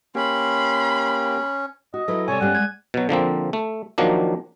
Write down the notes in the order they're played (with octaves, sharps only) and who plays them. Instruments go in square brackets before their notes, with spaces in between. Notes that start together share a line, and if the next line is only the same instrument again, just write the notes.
[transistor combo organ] A#3 G4 [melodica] C#4 [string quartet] B5 C6
[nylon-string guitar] F#4 [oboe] D#5
[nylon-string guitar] F#3 E4 B4 [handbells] A4
[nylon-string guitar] C3 G3 [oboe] C#5 [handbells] D5 G#5
[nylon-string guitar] G2 G3 C#4 [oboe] F#5
[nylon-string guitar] G#3 [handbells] G#6
[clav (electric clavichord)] B2 F#3
D3 F3 A#3 C4
A3
D#3 F3 F#3 A#3 D4